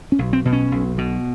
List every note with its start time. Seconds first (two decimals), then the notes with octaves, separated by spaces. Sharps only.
0.12 C#4
0.19 B1
0.33 C4
0.45 B2
0.53 C#4
0.72 B1
0.98 B2